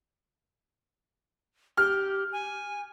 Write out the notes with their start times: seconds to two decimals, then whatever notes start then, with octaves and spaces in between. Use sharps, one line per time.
1.77 G4 F6
2.32 G#5